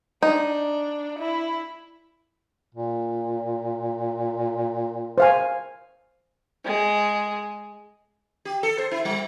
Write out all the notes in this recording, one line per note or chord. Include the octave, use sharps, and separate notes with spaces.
D4 D#4
E4
A#2
C5 F5 G#5
G#3
G4
A4
C5
E4
G3